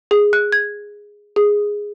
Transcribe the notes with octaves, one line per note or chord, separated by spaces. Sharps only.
G#4
F#6
G#6
G#4